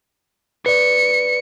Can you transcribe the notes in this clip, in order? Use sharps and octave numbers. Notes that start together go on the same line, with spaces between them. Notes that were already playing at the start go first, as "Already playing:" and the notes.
B4 D5 C#7